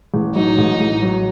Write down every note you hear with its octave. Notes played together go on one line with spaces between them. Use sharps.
A1
F#3 D#4
A1
A1
F#3